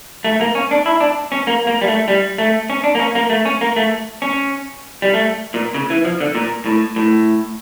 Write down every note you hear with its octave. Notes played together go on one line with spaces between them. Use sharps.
A3
A#3
C#4
D4
E4
D4
C#4
A#3
A#3
G3
A3
G3
A3
C#4
D4
A#3
C#4
A#3
A3
C#4
A#3
A3
C#4
G3
A3
A#2
C#3
E3
F3
D3
A#2
A2
A2